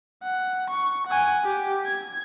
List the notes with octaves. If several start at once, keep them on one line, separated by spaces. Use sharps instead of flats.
F#5
C#6
F#5 G#5
G4
G#6